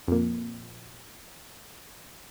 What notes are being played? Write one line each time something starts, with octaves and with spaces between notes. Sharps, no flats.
F2 A#2